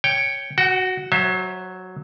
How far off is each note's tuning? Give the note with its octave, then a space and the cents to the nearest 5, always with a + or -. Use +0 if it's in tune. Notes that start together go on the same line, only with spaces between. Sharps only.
C#5 +0 G5 +0
F#4 +0 F#5 +45
F#3 +0 C5 +35 E5 +0